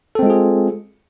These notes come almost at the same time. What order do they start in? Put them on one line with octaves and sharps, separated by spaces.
A4 C4 G#3 F4 G#4